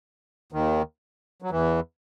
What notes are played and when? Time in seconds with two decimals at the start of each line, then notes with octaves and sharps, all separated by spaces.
0.52 D#2 D#3
1.42 F#3
1.51 E2 E3